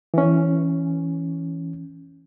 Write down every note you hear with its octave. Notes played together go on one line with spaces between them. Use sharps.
E3 C#4